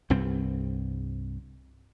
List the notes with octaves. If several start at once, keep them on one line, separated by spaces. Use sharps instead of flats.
C2 G2 C4